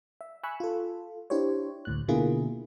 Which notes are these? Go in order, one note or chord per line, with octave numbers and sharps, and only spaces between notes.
E5
G#5 B5 C#6 E6 F#6
F4 A4
D4 E4 G4 C5 C#5
D2 A2 F#6
B2 D3 A#3 E4 F4 G#4